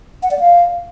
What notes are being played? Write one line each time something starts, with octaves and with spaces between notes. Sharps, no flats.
F#5
D5
F5